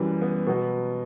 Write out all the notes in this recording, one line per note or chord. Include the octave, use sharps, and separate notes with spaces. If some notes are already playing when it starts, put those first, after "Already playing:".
Already playing: F#2 E3 G3 B4
B3
B2 F#3 B3